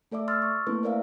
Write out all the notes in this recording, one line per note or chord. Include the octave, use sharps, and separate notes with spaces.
A3 A4 D5 E5 D6
C6 E6 F6 A6
C#6
A3 A#3 C4 E4 A4 B4
A#4 C5 D5 E5 F5